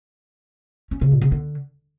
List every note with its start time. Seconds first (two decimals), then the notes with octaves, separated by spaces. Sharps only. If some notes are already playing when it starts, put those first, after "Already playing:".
0.91 C#4
1.01 C#3
1.11 A#2
1.22 C#3
1.32 D3